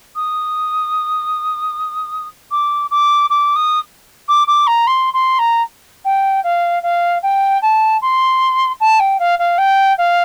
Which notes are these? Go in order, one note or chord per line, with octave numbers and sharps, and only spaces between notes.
D#6
D6
D6
D6
D#6
D6
D6
A#5
C6
C6
A#5
G5
F5
F5
G5
A5
C6
A5
G5
F5
F5
G5
F5